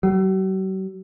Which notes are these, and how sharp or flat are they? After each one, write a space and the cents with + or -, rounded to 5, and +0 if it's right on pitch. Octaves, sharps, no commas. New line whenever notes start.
F#3 +45